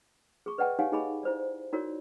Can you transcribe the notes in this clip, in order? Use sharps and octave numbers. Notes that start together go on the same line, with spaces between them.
G#4 C#6
B4 D5 D#5 F#5 G5 A5
D#4 G4 C#5 F5 F#5 G#5
D#4 G4 G#4 D#5 G#5 B5
E4 C5 D5
D#4 E4 F#4 A#4 C#5 D5